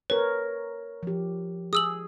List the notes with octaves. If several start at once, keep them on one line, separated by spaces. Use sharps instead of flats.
A#4 B4 C#5
F3 G4
G#4 D#6 E6 F#7